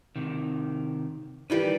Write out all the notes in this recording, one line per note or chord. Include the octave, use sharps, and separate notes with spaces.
C3 D#3
D#3 E3 G3 B4 D5